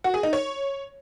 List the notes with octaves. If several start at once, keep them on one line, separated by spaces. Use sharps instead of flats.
F#4
G#4
D#4
C#5